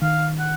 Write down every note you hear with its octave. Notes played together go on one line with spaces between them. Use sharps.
D#3 F5
F#5